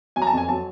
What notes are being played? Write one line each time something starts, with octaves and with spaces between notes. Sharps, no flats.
F#3 G#5
A#5
A5
F2 G#5
F#3 A5